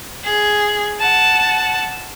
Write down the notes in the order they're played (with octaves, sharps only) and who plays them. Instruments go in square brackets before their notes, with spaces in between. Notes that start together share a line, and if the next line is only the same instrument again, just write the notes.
[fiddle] G#4
F#5 A5